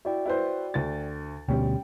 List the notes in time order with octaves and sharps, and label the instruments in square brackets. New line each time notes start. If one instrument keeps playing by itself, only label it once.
[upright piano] E4 [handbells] F#4 D5 G5
[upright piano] E4 B4 C5
D2 A6
[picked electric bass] D2 B2 [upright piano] G3 C#4 [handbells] G5